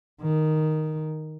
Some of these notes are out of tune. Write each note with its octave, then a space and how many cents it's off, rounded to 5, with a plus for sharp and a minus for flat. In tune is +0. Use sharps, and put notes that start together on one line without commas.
D#3 +0